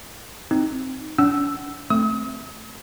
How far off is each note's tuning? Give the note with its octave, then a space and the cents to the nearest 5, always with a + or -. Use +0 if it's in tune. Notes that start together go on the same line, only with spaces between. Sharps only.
C4 +0 D#4 +0
D4 -40 F#5 +20 E6 +0
A3 +0 C4 +0 D#6 +45